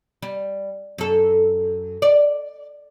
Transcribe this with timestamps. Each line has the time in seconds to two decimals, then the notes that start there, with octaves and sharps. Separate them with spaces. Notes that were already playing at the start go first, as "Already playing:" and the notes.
0.22 G3
0.98 F#2 A4
2.02 D5